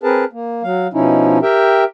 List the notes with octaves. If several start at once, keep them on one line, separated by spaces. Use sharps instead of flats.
C4 G#4 A#4 B4 A5
A#3
F#3 F5
B2 F3 C#4 D#4 E4
G4 A#4 E5 G5